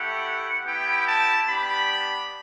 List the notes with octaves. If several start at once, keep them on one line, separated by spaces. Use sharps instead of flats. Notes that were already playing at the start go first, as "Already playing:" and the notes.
Already playing: A3 E4 G4 F#5
B3 E4 G4 G5
A5
B3 D4 G4 B5